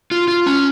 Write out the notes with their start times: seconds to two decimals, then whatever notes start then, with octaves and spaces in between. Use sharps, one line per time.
0.11 F4
0.28 F4
0.46 C#4